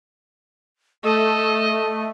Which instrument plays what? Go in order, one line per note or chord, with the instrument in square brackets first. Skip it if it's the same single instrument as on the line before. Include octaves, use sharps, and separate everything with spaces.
[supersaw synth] A3 [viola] A4 [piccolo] D#5